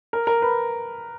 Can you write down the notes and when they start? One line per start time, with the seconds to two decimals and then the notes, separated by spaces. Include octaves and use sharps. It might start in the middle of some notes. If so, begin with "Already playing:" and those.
0.13 A#4
0.27 A#4
0.42 B4